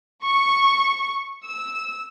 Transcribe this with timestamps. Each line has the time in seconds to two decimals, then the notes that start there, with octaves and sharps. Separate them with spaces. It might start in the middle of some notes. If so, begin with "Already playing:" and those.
0.25 C#6
1.45 E6